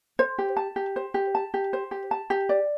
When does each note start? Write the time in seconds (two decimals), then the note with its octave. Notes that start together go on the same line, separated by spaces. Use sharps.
0.19 C5
0.39 G4
0.57 A5
0.76 G4
0.96 C5
1.14 G4
1.35 A5
1.54 G4
1.73 C5
1.91 G4
2.11 A5
2.30 G4
2.49 D5